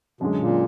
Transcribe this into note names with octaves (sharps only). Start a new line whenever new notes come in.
F#2 B2 D3 G#3
A#2